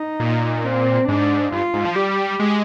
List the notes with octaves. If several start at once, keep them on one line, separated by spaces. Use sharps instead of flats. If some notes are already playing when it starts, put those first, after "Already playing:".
Already playing: D#4
A#2
C4
G#2 D4
G2 F4
G#2
F3
G3 G4
G#3